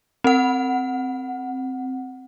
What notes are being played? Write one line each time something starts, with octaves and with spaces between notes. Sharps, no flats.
C4 F#5